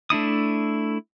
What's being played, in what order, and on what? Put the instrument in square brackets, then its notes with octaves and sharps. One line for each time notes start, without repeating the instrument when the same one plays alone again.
[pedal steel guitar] A3 D4 E4 D#6